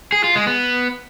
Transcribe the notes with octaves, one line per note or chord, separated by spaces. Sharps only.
G#4
F4
G#3
B3